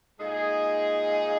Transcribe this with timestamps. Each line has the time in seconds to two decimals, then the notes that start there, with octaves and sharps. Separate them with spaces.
0.20 A#2 G#3 D#4 G#4